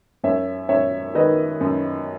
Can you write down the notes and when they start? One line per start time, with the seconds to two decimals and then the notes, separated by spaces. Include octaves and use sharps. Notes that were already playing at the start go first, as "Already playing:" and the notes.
0.24 F#2 C#5 E5
0.69 F#2 C#5 E5
1.15 D#3 B4 D#5
1.61 F#2